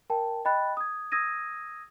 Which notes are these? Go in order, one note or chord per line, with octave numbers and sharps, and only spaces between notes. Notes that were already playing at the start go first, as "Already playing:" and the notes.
A#4 G5 A5
D#5 G5 B5 F#6 A6
D#6 G#6
D#6 E6 G#6 A#6 D#7